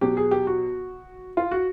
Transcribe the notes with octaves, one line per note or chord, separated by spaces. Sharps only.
B2 F#3 G4
G#4
G4
F#4
F4
F#4